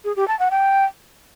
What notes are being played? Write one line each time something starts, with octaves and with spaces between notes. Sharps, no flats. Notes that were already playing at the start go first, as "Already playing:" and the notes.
G#4
G4
A5
F#5
G5